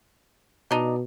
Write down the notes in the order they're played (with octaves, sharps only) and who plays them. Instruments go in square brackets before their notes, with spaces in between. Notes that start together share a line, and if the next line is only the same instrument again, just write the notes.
[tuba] B2 [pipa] D4 D#4